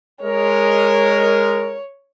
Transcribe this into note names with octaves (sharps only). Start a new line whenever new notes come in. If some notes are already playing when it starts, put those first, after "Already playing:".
G#3 A#4 C#5